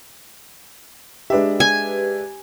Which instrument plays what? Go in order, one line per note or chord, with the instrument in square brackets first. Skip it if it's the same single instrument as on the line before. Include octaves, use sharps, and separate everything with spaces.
[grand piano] G#3 D4 E5 [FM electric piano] G4 B4
[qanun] G#5